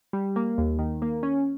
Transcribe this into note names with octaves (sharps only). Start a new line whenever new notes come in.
G3
A#3
D#2
D#3
A#3
C#4